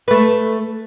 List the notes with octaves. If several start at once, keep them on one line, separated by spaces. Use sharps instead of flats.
A3 B4